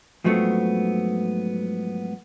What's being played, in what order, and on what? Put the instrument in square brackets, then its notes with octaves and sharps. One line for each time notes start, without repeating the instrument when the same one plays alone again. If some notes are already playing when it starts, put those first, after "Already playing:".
[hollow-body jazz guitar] G#2 F3 F#3 A3 B3 C4